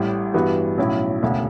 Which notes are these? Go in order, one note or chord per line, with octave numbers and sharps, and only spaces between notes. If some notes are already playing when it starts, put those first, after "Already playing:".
Already playing: A1 A2 G3
G2 E3 G3 B3 F#4
B1 A2 F#3 C#4 E4
E1 D2 C#3